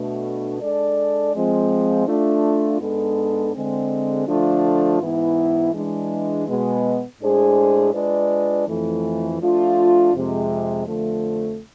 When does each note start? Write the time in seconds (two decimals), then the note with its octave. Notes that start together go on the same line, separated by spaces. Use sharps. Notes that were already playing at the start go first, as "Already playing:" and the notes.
Already playing: B2 A3 D4
0.61 G#3 D4 A4 D5
1.34 F3 G#3 C4
2.07 A3 D4 F4
2.81 G#2 G#3 B3 D4 A4
3.54 D3 G#3 C4
4.27 D3 F3 A3 D4 F4
5.01 G#2 E3 B3 E4
5.74 E3 G#3 D4
6.48 B2 G#3 B3
7.20 A2 G#3 D4 G#4 C5
7.94 G#3 D4 F4 B4 D5
8.67 F2 E3 A3
9.40 F3 A3 D4 F4
10.14 F2 C3 G#3
10.87 F2 D3 F3 A3